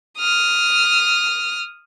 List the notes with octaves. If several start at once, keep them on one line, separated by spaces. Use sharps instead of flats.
D#6 F6